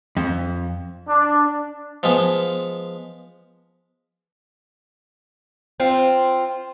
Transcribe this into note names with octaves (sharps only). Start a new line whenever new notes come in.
F2
D4
F3 G#3 B3
C4 F4